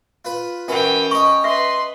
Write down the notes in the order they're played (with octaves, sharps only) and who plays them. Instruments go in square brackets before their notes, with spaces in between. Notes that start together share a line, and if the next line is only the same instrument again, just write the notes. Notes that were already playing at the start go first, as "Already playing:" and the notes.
[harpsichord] F4 B4
[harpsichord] F#2 E3 B4 [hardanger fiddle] C#4 G5
[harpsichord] D#5 A#5 [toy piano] C#6
[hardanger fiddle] B4 C6 [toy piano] E5